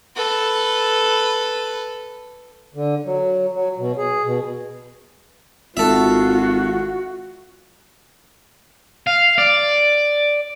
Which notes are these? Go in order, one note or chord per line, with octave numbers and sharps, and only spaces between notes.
A4 B4
D3
F#3
F#3
B2
G#4
B2
G#1 F4 F#4 A4 E5
F5
D5